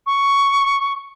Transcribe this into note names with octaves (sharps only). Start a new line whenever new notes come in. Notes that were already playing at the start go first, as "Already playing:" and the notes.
C#6